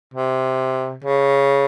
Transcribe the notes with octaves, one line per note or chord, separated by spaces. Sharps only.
C3
C#3